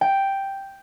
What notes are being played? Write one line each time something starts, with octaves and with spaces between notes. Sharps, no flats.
G5